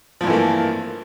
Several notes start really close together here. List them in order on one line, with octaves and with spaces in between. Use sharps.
F3 G2 E3 A3 A#3